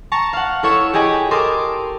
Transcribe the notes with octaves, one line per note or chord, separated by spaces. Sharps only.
A5 A#5 C#6
F5 F#5
E4 A4 C#5 C#6 E6
G4 G#4 D#5 G#5 B5
G4 A4 A#4 C6 D6 D#6